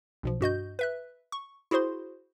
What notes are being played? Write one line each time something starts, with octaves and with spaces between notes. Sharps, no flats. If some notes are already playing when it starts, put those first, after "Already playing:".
B1 B2 F3
G2 F#4 D#5 G6
B4 E5 F#6
C#6
E4 F#4 G#4 C5 C6